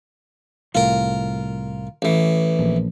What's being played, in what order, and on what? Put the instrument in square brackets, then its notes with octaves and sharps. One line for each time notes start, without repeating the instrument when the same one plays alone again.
[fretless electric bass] C2 A2 [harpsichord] F4 A#4
[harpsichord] A1 E3
[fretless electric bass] A#1